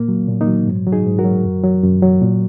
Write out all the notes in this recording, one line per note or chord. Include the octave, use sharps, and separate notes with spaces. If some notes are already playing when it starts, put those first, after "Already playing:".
Already playing: A#2 A#3
F#3
A#2
A#3 D#4
F#3
G#2
F#3
D#4 G#4
G#2
F#4 A#4
F#3
F#2
F#3
F#2
F#3
A#2